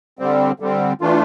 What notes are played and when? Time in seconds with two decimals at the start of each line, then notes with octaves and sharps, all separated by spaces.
0.19 D3 G3 C4
0.60 D3 G3 C4
1.01 E3 A3 D4 F4